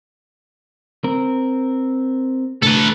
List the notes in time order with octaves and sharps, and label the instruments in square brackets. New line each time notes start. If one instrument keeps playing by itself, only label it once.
[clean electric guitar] C4 A#4
[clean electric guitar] C2 A2 D3 [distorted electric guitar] A4 B4